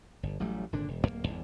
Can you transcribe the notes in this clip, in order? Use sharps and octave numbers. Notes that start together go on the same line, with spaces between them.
G1
A1 F#3 G3 A3
G#1 A#2 D3 D4
E1
D1 F2 A#3
G1 E2